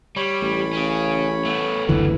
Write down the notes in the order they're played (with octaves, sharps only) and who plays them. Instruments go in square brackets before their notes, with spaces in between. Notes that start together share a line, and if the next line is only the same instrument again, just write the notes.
[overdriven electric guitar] G3 [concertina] C#5 B5
[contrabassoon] A1
[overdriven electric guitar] C#4 G#4
A3 B3
[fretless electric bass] F#1 D2 E3 [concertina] B4